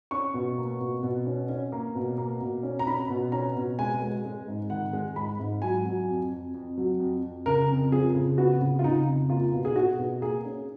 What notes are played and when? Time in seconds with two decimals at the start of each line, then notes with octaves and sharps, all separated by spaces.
0.11 C#4 C#6
0.34 B2
0.58 A#3
0.80 B2
1.03 B2
1.26 C#4
1.49 C#4
1.72 A#3
1.95 B2
2.18 A#3
2.41 B2
2.63 C#4
2.79 A#5
2.87 C#4 B5
3.10 B2
3.32 C#4 A#5
3.56 B2
3.79 G#3 G#5
4.02 G#3
4.25 G#3
4.48 G#2
4.70 D#3 F#5
4.93 G#3
5.16 G#2 B5
5.40 G#2
5.62 F#3 G#5
5.85 F#3
6.08 F2
6.32 F2
6.54 F2
6.77 F#3
7.00 F2
7.23 F2
7.46 C#3 A#4
7.70 F2
7.92 F3 G#4
8.15 C#3
8.38 B3 F#4
8.61 C#3
8.79 F4
8.84 C#3 D#4
9.06 F2
9.29 A#3 F4
9.52 B2
9.65 G#4
9.76 B2 F#4
9.98 B2
10.21 A#3 G#4
10.45 C#4